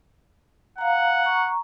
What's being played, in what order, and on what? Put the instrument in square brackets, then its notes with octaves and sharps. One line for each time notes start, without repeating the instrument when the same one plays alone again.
[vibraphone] F5 A#5 [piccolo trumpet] F#5
[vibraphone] A#5 C#6